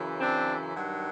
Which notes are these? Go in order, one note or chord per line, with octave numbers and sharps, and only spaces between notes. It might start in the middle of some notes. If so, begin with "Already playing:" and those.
Already playing: F#2 C#3 E3
C4 D4
G2 D#3 F#3